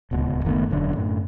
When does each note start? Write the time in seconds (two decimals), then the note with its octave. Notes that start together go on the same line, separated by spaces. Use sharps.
0.11 D1 C#2 B2
0.45 F#1 D#3 A3 B3
0.71 E1 F#2 D3 D4
0.96 F#2 A2